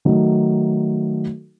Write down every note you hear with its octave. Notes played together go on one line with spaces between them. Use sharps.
D#3 F#3 A3 D#4